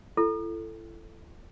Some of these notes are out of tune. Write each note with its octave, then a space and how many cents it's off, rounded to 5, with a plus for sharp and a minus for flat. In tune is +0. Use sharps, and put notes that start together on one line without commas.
E4 +40 A4 +0